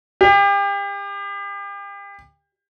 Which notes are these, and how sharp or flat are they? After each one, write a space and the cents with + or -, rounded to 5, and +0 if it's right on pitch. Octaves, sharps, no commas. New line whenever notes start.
G4 +35